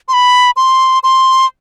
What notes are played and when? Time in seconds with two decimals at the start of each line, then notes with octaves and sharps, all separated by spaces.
0.08 C6
0.13 B5
0.56 C6
1.04 C6